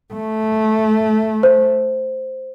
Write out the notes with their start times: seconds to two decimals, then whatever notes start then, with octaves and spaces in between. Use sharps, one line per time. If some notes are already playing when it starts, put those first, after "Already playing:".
0.14 A3
1.43 C5